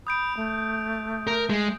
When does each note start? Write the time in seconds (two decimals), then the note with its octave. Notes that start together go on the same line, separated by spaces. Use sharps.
0.07 B5 D#6 G6 D7
0.37 A3
1.27 A#4
1.50 G#3